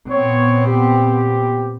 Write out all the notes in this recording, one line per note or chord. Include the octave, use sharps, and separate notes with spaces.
A#2 B3 C4 C#5
G4